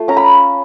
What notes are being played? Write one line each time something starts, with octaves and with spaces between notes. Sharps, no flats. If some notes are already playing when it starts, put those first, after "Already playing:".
Already playing: A3 F4
C#4 A#5
B5